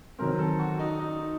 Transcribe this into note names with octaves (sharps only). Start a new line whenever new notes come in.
D#3 F#3 C4 A#4
A4
F#4
D#4
D#4